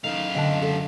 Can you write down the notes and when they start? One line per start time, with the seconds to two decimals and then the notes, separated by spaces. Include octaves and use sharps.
0.04 F#2 D#3 A3 F5
0.35 D3 B3 D#5 G5 A5 F#6
0.62 A4